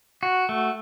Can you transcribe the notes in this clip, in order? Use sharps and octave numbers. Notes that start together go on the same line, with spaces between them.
F#4
A3